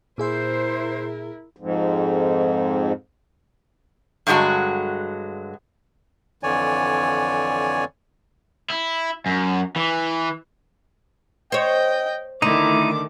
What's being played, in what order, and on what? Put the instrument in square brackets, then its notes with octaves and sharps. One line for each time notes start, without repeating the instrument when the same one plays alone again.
[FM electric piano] A#2 G#4 E5 [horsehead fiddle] E4 A#4 [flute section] C5
[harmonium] F2 G#2
[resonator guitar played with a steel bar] G2 D3 F#3 G#3 F#4
[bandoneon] F2 D3 E3 C#5 D5 G#5
[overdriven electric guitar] E4
F#2
E3
[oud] C5 C#5 [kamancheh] D#5 G5
[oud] D3 [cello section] D#3 A3 [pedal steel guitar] D#4 E4 [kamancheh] D6